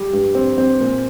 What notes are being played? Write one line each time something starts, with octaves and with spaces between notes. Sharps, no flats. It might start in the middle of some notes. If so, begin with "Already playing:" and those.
Already playing: G3 G4
G2
C4
C4
A#2